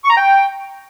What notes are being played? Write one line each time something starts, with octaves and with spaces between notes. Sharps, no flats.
C#6
A#5
G5